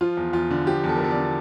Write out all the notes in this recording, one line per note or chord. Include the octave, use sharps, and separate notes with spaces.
F3 F4
E2
E2 F4
D3
F3 G4
E2
A4
A#4
E2 A4
D5
D3